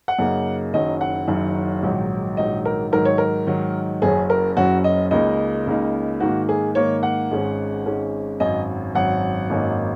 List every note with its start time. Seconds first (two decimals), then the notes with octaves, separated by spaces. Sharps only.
0.08 F#5
0.19 F#2 C#3 F#3 A#3 D#4
0.73 F#1 F#2 D#3 F#3 D#5
1.01 F#5
1.28 F#1 F#2 D#3 F#3
1.83 A#1 G#2 D#3 F#3 D#4
2.37 A#1 G#2 D#3 F#3 D#4 D#5
2.65 A#4
2.92 G#2 D#3 F#3 A#4
3.05 C#5
3.18 A#4
3.47 G#2 D#3 F#3
4.02 F#1 F#2 F#3 C#4 G#4
4.30 A#4
4.57 F#1 F#2 F#3 C#4 F#4
4.84 D#5
5.11 C#2 C#3 A#3 D#4 D#5
5.67 C#2 C#3 A#3 D#4
6.20 G#2 D#3 A#3 F#4
6.49 G#4
6.75 G#2 D#3 A#3 C#5
7.03 F#5
7.31 G#1 G#2 G#3 C#4
7.85 G#1 G#2 G#3 C#4
8.40 G#1 F#2 F#3 D#5
8.95 G#1 F#2 F#3 F#5
9.49 G#1 F#2 F#3 A#3 D#4